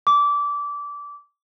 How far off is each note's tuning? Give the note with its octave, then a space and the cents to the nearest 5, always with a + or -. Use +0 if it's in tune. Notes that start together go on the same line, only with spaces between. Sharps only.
D6 -20